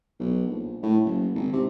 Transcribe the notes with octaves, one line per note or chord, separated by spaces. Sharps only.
B1
A#1
A2
F#1
G#1
C3